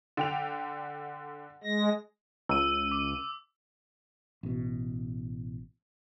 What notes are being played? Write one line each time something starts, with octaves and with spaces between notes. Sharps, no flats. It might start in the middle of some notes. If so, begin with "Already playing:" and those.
D3 G5 F7
G#3 A#6
C#2 E6 D#7
D6
A1 B2